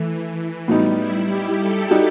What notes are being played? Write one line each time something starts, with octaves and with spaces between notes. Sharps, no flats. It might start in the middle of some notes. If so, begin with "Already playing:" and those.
Already playing: E3 A3
A2 F#3 G3 B3 D#4
E4
G4
A4
G3 D#4 F#4